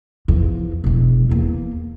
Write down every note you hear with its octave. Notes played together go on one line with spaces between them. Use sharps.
E2 F3
E1 G#3
E2 A#3